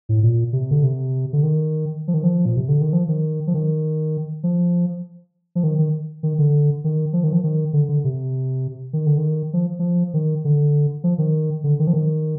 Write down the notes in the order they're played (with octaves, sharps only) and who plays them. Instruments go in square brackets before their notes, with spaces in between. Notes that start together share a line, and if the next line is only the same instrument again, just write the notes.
[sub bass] A2
A#2
C3
D3
C3
D3
D#3
F3
D#3
F3
A#2
C3
D3
D#3
F3
D#3
F3
D#3
F3
F3
D#3
D#3
D#3
D3
D#3
F3
D#3
F3
D#3
D3
D3
C3
D#3
D3
D#3
F3
F3
D#3
D3
F3
D#3
D3
D#3
F3
D#3